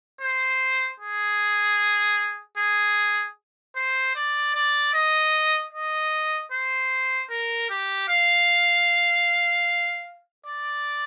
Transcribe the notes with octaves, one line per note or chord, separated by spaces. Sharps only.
C5
G#4
G#4
C5
D5
D5
D#5
D#5
C5
A#4
G4
F5
D5